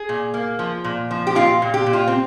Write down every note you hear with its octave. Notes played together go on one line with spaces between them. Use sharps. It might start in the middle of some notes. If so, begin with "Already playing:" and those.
Already playing: G#4
A#2
A#3
F3
A#2
F3
G4
A#2 F4
A#2
G4
A#2
F4
C4